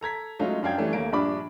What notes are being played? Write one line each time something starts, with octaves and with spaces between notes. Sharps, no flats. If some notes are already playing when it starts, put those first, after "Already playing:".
A4 A#5 G#6 B6
F#3 G#3 A3 C#4 D#4 F4
F#2 D4 F5 G5 G#6
E3 G3 A3 C#4 D4
D#2 A3 A#3 D7
A#1 G2 D4 B5 D6